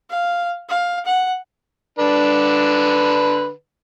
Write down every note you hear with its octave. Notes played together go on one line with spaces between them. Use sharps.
F5
F5
F#5
D3 D4 B4